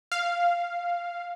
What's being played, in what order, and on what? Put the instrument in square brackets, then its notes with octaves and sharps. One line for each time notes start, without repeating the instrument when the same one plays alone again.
[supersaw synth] F5